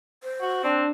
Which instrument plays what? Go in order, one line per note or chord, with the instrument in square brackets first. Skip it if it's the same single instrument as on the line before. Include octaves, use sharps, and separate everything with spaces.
[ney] C5
[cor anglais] F#4
[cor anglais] C4 [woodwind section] D4